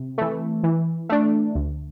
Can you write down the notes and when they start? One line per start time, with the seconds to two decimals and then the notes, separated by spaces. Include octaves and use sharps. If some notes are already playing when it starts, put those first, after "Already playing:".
Already playing: C3
0.18 E3 A3
0.63 E3
1.09 A3 D4
1.55 D2